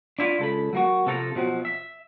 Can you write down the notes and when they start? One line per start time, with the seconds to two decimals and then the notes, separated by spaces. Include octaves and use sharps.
0.19 D4 E4 F4
0.39 C#2 A4 B5
0.73 F#3 A#3 F#4
1.06 C3 F3 A4 F#5 A#5
1.35 B2 F3 F#3 C4
1.65 E5